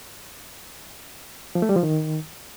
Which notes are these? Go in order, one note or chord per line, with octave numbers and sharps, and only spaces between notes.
F3
A3
G3
F3
D#3